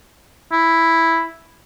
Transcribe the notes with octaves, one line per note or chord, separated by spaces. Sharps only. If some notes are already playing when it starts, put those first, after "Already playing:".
E4